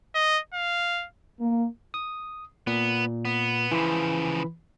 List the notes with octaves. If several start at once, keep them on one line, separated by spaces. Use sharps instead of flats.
D#5
F5
A#3
D#6
A#2 B3
B3
C#3 E3 F3 B5